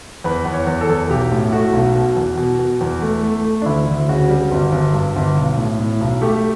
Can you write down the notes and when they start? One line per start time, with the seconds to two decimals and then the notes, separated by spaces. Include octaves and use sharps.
0.24 E2 B4
0.46 E2
0.53 C#5
0.67 E2
0.81 A4
0.89 E2
1.10 B1 G4
1.32 A2
1.53 A3 F#4
1.73 B1
1.95 B2
2.16 E2
2.38 B2
2.59 B2
2.81 E2
3.02 A3
3.23 A3
3.44 A3
3.62 D4
3.66 D2 E4
3.87 D2
4.09 C#3 F#4
4.29 G3
4.51 G1
4.72 G1
4.94 G2
5.16 G1
5.37 B1
5.58 A2
5.80 A2
6.01 B1
6.21 A3 G4